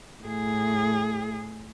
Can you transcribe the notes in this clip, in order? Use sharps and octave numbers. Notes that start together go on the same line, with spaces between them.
A2 G#4